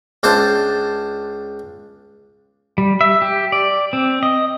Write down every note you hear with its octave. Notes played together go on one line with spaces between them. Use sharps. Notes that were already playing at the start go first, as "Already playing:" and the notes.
C#2 D4 C5 A5
G3
E5
G4
D5
C4
D#5